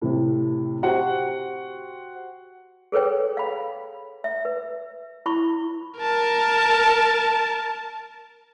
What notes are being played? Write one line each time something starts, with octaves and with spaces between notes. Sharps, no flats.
A2 C3
F#4 G4 C5 F#5
G#4 A4 B4 C#5 G5
F5 B5
E5
B4
E4 B5 C#6
A#4 A5